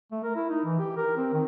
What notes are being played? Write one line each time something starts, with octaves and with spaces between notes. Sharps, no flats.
A3
A#4
E4
D#4
E3
G4
A#4
C4
D#3